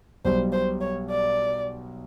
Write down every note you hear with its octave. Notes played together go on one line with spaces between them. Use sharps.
B1 B2 G3 C5
C5
C#5
D5